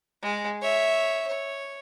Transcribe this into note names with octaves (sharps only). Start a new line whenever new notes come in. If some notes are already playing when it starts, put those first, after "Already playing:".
G#3
C#5 E5
C#5